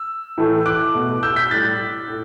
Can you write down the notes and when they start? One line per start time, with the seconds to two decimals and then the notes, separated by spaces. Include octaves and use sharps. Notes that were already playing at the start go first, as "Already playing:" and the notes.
Already playing: E6
0.37 A2 E3 A3
0.66 D6 F#6
0.94 B2 A3
1.23 E6 G6
1.36 G6 B6
1.51 A2 G3 F#6 A6
2.08 A2